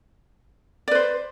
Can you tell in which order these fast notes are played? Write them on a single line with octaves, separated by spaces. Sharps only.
D5 B4 C5